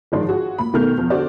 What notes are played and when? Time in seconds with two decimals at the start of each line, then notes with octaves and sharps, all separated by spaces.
0.12 G1 G#2 D#3 F3 D5 C6
0.28 F4 F#4 G#4
0.58 A#2 B5
0.74 B2 D#3 A3 A#4 F6 G6
0.98 E2 F3
1.10 D3 F#4 C5 D5